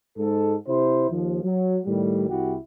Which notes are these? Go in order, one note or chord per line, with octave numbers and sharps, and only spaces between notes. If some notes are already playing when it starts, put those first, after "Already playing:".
G#2 A4
C3 E4 C5
D#2 F3
F#3
A2 D#3 G3
C2 E4 F#4 G4